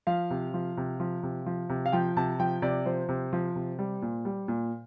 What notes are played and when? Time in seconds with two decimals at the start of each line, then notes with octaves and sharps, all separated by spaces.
0.07 F3 F5
0.30 C3
0.54 F3
0.77 C3
1.00 F3
1.23 C3
1.46 F3
1.69 C3
1.86 F5
1.92 F3 G5
2.16 C3 A5
2.39 F3 G5
2.62 C3 D5
2.86 F3 C5
3.09 C3
3.33 F3
3.55 C3
3.79 G3
4.02 A#2
4.25 G3
4.48 A#2